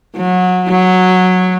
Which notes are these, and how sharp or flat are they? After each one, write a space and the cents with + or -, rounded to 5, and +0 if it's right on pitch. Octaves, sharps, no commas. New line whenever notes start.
F#3 -25
F#3 -10